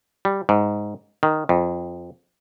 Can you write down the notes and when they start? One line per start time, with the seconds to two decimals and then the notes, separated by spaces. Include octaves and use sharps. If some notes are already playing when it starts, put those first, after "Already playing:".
0.25 G3
0.49 G#2
1.23 D#3
1.49 F2